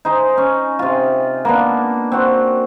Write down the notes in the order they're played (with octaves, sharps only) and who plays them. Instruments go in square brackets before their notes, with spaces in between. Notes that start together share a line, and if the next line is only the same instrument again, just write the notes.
[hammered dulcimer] D#4 C5 G#5
C#4
C3 F4
A#3 B3 D4
C4 F#4